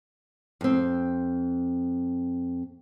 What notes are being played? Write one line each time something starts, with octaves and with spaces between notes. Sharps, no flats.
F2 C4